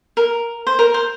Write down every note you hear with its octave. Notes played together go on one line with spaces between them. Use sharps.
A#4
C5
A#4
C5